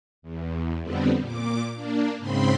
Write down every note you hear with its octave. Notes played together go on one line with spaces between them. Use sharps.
E2
F2 D3 G3 B3 C4
A#2 D6
A#3 D4
G#2 C#3 C4 B5 C6